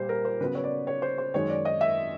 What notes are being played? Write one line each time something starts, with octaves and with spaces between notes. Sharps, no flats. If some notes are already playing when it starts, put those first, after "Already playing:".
Already playing: A#2 G3 C5
A#4
C5
C#3 F#3 B3 B4
C#5
D5
C#5
C5
C5
F#2 D#3 G#3 C#5
D5
D#5
E5